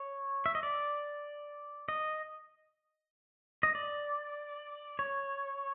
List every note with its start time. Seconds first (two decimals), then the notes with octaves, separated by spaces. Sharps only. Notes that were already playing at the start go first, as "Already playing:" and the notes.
Already playing: C#5
0.46 E5
0.55 D#5
0.63 D5
1.88 D#5
3.63 D#5
3.75 D5
4.99 C#5